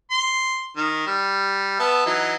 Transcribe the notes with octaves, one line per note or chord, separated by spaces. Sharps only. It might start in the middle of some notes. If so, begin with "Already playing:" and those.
C6
D#3
G3
B3 E5 A5
E3 F#3 D#4